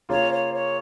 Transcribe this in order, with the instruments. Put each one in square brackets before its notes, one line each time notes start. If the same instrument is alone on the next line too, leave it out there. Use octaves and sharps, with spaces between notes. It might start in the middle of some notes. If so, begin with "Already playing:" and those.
[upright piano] C#3 A#3 F4 [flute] C#5
[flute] C#5
C#5